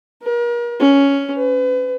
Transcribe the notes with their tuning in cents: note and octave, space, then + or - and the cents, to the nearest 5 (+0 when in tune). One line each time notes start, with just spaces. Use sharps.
A#4 +40
C#4 +5
B4 +35